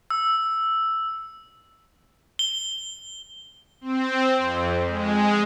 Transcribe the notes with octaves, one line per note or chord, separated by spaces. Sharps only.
E6
G7
C4
F2
G#3